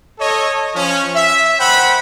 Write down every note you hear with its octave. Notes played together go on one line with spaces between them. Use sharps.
A4 C#5 D#5
F3 C#4
E5
D#3 C5 F#5 G5 B5